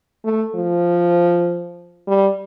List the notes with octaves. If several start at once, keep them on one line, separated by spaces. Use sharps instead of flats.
A3
F3
G3